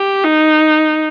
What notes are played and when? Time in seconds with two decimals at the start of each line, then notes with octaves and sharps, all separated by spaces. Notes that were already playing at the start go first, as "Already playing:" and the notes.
Already playing: G4
0.24 D#4